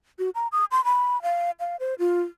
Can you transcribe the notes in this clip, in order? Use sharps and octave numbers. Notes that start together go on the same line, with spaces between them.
F#4
A#5
D#6
C6
B5
F5
F5
C5
F4